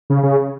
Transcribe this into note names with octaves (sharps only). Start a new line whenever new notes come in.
C#3
C#3